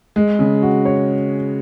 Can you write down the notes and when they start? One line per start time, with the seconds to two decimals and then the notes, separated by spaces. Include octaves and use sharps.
0.16 G#3
0.39 C#3
0.62 F#4
0.85 C#5